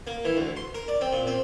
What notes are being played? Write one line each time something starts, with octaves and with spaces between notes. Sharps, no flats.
A#3
E3
D2
C6
A#4
D5
C4
A#2
C4